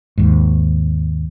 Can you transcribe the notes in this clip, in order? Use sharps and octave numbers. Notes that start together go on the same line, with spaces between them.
D#2 G#2